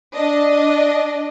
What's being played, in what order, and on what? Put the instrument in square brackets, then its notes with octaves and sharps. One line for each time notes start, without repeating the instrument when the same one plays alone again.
[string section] D4 D#5